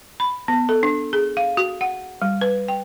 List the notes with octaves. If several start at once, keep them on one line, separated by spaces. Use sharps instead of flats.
B5
B3
A4
D4
G#4
F5
F#4
F#5
G3
B4
G5